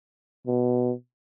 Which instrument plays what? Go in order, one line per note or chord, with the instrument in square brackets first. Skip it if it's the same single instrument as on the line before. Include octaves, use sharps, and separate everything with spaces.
[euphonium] B2